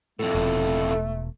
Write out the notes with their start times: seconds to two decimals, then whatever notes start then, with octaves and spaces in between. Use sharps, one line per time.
0.19 F2 A2 A3 A4
0.35 E1